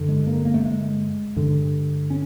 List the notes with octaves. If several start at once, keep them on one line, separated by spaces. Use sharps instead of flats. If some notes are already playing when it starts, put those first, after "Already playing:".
Already playing: G2 D3
G#3
A#3
A#3
A3
G#3
G2 D3
C#4